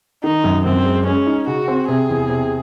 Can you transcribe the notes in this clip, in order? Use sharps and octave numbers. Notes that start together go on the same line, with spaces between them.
D#3 D#4
F#2
F#2 C4
G#3
G#3 C#4
D#4
C#3 F#4
C4
C3 G#4
E2
C3